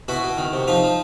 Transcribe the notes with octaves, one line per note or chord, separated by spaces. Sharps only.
B2 E4 F#4
B2
D#3
C3
F3 D#4 F4
F3